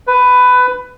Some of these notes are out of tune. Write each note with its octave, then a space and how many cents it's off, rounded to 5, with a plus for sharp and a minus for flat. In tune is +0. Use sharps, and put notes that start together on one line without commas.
B4 +15